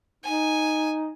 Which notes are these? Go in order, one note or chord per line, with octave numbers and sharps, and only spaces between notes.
D#4 G#5